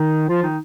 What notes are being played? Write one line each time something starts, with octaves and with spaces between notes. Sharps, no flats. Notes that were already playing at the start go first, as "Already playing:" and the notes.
Already playing: D#3 D#4
F3 F4
D#3 D#4